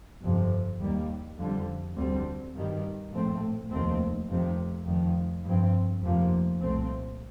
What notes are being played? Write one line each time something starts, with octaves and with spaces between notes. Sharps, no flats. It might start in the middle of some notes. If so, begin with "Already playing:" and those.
G1 F2 C3
D#2 D#3 G3 A#3
F2 D3 G3
D2 D3 G3 C4
G2 D#3 G3
A#1 A2 A3 C4
F1 D#2 D#3 A3 C4
F1 F2 C3 D#3
F1 F2 D#3
G2 F3 C4
F1 F2 C3 F3 A#3
C2 A#2 A3 C4